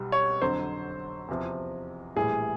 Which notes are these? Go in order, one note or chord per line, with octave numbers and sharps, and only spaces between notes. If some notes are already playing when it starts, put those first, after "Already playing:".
Already playing: B1 B2 G3
C#5
F2 D3 F#3 C5
E2 C3 F3
A#1 A2 E3 G3 G#4